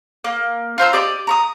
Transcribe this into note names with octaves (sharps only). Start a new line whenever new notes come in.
A#3
F4 C5 A#5 E6
G4 D5 D#5 D6
A#5 C#6 D#6